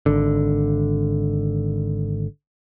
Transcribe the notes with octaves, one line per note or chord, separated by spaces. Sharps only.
G#1 D3